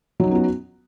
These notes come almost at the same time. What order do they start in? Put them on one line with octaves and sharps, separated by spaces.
F#3 D#4 C#4 B3 F#4